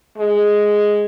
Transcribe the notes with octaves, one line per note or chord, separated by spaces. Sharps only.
G#3